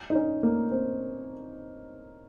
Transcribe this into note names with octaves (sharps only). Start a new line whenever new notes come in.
D#4
C#4
A#3
C4